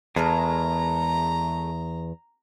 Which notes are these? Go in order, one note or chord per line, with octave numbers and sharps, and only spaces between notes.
E2 G#3 A3 A#4 A#5